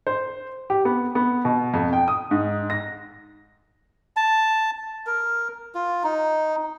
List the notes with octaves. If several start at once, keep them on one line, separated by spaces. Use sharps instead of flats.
C5
G4
B3
B3
B2
F2
G5
D#6
G#2
A#6
A5
A#4
F4
D#4